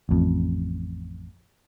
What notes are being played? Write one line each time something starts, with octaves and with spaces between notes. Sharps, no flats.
A1 F2